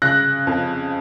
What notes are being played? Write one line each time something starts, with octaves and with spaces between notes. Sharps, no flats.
C#3 F#6 A#6
F2